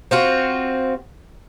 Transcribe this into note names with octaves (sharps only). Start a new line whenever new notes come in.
C4 F4 F#4